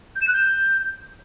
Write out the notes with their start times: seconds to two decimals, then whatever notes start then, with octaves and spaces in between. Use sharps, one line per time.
0.16 G6
0.22 E7
0.28 F#6
0.33 G6